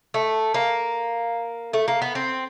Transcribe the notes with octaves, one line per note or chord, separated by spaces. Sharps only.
A3
A#3
A3
A#3
B3
C4